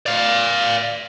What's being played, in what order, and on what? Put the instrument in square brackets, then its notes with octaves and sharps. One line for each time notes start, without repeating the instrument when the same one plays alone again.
[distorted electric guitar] D5 F5